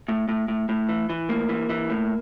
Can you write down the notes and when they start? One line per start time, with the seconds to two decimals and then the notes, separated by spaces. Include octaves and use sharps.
0.08 A2
0.29 A2
0.48 A2
0.69 A2
0.89 E3
1.09 E3
1.29 A2 A#3
1.49 E3
1.69 E3
1.90 A2